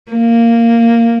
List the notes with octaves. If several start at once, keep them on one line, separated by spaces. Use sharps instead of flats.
A#3